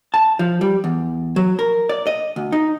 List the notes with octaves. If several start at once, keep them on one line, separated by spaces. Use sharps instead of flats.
A5
F3
G3
E2
F#3
A#4
D5
D#5
D2
D#4